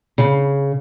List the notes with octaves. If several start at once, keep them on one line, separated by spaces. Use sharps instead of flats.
C#3